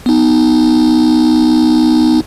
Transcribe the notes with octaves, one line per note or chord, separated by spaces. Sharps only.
B3 D#4